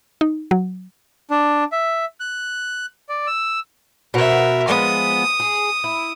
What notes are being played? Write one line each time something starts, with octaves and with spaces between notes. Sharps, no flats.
D#4
F#3
D4
E5
F#6
D5
E6
B2 A#4 C5 E5 F#5
F3 G#3 B3 D#6
G#4
E4